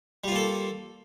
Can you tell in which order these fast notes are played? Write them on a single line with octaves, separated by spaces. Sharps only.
G3 F4 A#3 A4